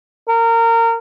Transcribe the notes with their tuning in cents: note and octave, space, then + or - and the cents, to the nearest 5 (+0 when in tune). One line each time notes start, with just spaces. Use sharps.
A#4 -25